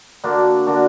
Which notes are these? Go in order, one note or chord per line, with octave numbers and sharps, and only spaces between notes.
D3 A#3 D4 F#4
D3 A#3 D4 F#4